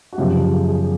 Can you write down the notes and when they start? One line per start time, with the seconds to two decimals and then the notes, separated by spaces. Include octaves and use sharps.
0.13 F#4
0.18 F#2 C#3 F3 G4
0.51 G#4
0.67 G#4